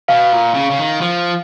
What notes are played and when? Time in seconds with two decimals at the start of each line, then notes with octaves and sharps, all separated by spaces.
0.09 B2 F5
0.32 A#2
0.54 C#3
0.70 C#3
0.79 D#3
1.01 F3